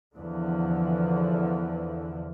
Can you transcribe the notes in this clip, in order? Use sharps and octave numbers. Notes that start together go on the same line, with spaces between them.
E2 D3 E3 F3